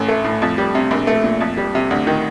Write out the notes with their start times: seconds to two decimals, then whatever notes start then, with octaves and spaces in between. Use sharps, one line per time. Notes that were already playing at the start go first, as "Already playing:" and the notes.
Already playing: A1
0.08 A3
0.24 A2
0.42 F2
0.58 G3
0.75 C3
0.91 A#1
1.07 A3
1.24 A#2
1.40 F2
1.57 G3
1.75 C3
1.91 D2
2.07 D#3